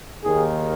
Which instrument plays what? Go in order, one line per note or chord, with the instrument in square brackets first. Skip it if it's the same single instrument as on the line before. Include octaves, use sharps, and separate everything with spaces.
[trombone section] D#2 D#3 G#4